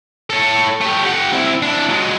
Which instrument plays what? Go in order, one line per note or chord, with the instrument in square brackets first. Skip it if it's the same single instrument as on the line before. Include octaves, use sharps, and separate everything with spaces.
[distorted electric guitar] A4 C#5
A3 G4
G4 F#5
C4 E4
D4 E4
F#3 G#3